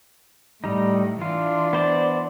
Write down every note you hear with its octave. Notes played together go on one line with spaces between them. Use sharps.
A2 G3 D#4
E3 D4 F4
B3 C5 D5